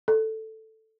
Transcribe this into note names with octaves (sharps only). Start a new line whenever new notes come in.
A4